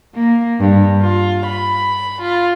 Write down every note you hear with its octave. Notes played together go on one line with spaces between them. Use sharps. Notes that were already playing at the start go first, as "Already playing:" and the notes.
A#3
G2
F4
B5
F4